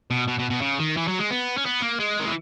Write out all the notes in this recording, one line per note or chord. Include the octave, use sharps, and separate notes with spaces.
B2
B2
B2
B2
C#3
D#3
E3
F#3
G#3
B3
C#4
B3
A#3
G#3
D#3
E3